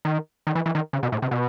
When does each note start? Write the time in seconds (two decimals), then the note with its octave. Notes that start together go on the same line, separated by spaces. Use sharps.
0.05 D#3
0.47 D#3
0.55 E3
0.66 E3
0.75 D#3
0.93 C#3
1.03 B2
1.12 A2
1.22 C3
1.31 B2